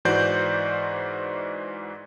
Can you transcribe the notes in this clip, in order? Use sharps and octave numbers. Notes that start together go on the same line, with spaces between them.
G#2 E3 F#4 C5 D5 G6